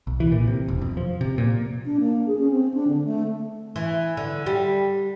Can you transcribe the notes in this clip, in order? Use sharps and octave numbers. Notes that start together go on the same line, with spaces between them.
B1
E3
A#2
C3
E1
F2
F3
C3
A#2
D4
A#3
G#4
C#4
C4
D4
D3
A3
E3
D3
G3